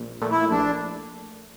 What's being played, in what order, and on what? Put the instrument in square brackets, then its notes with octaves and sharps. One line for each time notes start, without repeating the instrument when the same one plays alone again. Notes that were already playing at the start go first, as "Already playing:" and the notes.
Already playing: [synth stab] A#1
A#2 A3
[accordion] E4
[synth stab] A#1 [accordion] D4